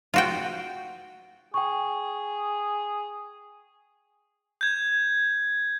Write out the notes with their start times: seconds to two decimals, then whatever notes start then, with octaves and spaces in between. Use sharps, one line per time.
0.14 F4 F#4 G5
1.54 G#4 G5 C#6
4.61 G6 G#6